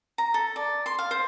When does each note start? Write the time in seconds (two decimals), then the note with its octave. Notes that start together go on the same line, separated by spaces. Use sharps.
0.18 A#5
0.34 A4
0.56 D5
0.86 C6
0.99 F5
1.11 C5